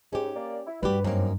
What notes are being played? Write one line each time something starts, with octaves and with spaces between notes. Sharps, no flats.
G#2 C#4 G4
A#3 D5
E4
G2 G3 F#4 G4 B4
F#2 A#3 C4 C#4 D#4